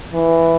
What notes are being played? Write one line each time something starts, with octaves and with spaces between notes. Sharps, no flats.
E3